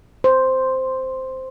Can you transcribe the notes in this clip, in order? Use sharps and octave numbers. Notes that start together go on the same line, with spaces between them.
C5